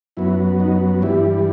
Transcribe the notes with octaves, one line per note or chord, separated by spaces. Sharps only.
F#2 F#3 B3 E4
D#4
G2 E3 G3 E4